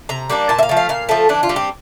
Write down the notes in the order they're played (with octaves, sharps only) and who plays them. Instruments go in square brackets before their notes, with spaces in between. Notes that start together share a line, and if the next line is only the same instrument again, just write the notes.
[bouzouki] C3 A#5
G3 A#3 D4
A#2 A5
E5
F5
F3 A3
F5
A#2 F5
F3 A3 A4
E3 D4
F4
G3 C4
G4